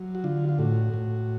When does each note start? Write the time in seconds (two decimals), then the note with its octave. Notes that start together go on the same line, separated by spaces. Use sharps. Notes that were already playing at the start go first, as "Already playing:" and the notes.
Already playing: F#3
0.15 F#4
0.24 D3 F4
0.49 F4
0.59 A2 F#4
0.94 A2